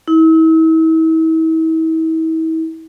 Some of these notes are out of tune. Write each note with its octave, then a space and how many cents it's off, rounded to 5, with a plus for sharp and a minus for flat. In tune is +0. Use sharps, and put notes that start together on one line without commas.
E4 -40